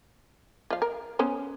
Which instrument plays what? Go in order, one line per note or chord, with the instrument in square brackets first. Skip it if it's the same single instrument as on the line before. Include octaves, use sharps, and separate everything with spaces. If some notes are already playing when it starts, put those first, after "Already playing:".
[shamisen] F3 F5
A#4
B3 C#4 C5